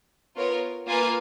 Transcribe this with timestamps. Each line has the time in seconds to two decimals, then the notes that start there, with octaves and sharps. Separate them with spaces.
0.36 B3 F4 A#4 C#5
0.88 A#3 F4 B4 F5 G#5